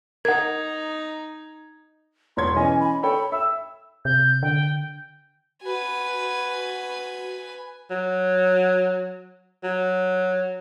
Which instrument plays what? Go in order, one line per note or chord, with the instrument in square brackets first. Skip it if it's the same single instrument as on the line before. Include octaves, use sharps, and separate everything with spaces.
[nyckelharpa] D#4 [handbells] A#4 F#5 [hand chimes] G#6
[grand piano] E1 C#5 G#6 [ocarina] C6
[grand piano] E3 C#4 D#5 [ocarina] G#5
[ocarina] B5
[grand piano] A4 C#5 G5 [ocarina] B5
[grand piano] E5 [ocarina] E6
[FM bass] C3 [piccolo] G6
[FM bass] D3 [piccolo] G5
[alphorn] F#4 [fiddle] B4 G#5
[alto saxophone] F#3
F#3